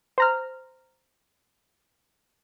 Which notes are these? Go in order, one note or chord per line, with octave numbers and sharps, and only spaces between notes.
C5 A#5 F6